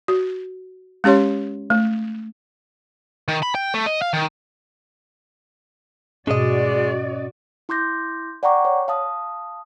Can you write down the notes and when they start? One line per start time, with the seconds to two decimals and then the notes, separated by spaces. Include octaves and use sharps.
0.08 F#4
1.04 G#3 C#4 G4 C#5 C6
1.70 A3
3.28 D#3
3.42 B5
3.55 G5
3.74 A3
3.86 D#5
4.02 F5
4.13 D#3
6.27 G#2 B2 G#3 C#4 F#4 D5 D#5 D#6
7.69 E4 C6 D6 G6 A#6
8.43 D5 F#5 G5 A#5 C#6 D6
8.65 C#5
8.88 F5 A5 D#6